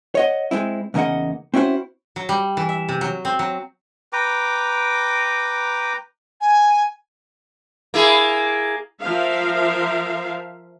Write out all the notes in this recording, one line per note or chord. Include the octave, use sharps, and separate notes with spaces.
C#5 D#5 F#5
G#3 A#3 C4 E4
E2 C#3 A#3 D#4 D#5 F#5
C4 C#4 E4 F#4 C5
F#3
G3
E3
E5
C3
F#3
C4
F#3
B4 G5 A#5 D6
G#5
A#3 E4 G#4
F3 A#4 E5 F5